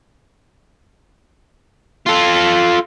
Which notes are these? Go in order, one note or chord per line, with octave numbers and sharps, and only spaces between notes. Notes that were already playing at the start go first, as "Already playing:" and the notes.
F4 A4